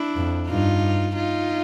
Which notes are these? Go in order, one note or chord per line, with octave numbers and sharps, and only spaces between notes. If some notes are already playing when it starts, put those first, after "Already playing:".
Already playing: D4 E4
F2
G2 D#4 F4
D#4 F4